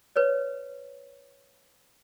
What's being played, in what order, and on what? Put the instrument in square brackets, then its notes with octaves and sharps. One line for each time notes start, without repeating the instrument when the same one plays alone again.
[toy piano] B4 C#5 D5